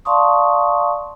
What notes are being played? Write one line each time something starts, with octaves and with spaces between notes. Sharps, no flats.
D5 F5 A5 C6 C#6 D#6